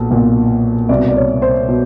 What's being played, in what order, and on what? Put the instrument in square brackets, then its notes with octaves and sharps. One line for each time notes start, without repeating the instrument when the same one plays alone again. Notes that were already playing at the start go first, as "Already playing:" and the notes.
Already playing: [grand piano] B1 A#2
B1 A#2
C2 D5
B2
D5
C#5
C5
B2